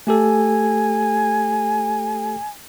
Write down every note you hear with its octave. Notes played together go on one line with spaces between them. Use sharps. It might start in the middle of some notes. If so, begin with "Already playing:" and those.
A3 G4 A4 G#5